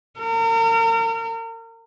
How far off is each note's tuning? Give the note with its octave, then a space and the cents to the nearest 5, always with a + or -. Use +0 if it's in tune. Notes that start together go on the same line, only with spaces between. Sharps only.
A#4 -35